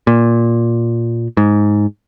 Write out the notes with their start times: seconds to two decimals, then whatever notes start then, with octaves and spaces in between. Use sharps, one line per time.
0.07 A#2
1.37 G#2